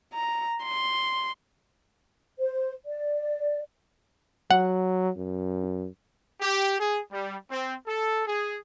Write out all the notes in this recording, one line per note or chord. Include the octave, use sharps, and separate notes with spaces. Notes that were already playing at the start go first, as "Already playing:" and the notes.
A#5
C6
C5
D5
F#3 F#5
F#2
G4
G#4
G3
C4
A4
G#4